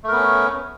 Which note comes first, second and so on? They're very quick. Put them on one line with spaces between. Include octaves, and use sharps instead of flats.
A3 A#4 B3 C#4